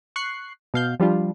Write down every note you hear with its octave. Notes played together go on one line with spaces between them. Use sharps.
C#6 F#6 C7
B2 F5 G6
F3 G3 D4 F4